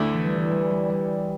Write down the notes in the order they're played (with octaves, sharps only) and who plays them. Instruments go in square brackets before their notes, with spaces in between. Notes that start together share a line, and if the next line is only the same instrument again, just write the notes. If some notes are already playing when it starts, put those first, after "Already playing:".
Already playing: [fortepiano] D2 D3 A3 E4
[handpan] E3
G3
E3
G3
G3
G3